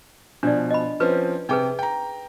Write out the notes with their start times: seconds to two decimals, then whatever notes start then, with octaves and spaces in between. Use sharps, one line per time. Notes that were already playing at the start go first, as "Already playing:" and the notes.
0.43 B2 F3 D4 D5
0.70 D#5 B5
1.00 F3 C4 C#4 B4
1.49 C3 D#4 G#4 B4 G5
1.79 G5 A#5